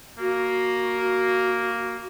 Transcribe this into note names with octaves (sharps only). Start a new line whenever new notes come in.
A#3 F#4